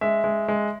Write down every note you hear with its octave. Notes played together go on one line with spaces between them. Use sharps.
G#3 E5
G#3
G#3